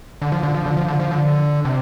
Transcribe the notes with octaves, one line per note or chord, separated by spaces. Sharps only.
D3
F3
D3
F3
D3
F3
D3
F3
D3
C3